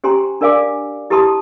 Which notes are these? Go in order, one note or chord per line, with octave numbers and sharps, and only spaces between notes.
C#4 G4 C5 G#5 A#5 C6
D4 A#4 D5 F5 G#5 D6
E4 G4 B4 A5 C6 D#6